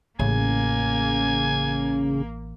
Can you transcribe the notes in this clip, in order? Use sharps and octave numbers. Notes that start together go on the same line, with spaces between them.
A1 C#3 A#3 G#5